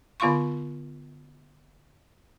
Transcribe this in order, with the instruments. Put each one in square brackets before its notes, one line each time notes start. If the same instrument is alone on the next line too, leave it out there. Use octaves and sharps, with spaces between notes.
[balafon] D3 B3 F4 F5 C6 C#6